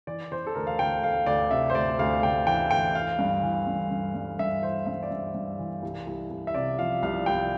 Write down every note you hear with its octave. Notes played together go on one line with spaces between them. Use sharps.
E3 D5
E3 C5
A4
D2 A#4
F5
D2 G5
D2 F5
D2 D5
C3 E5
C5
D2 D5
D2 F5
D2 G5
E3 G5
D2 G5
E3 F5
G2
E3
G2
G2
G2
G2 E5
E3 C5
G2 E5
D5
G2 E5
G2
E3
C2
C2
C2
E5
C3 D5
F3 F5
C2 F5
C2 G5